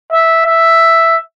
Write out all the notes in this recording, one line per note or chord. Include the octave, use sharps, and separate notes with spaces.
E5
E5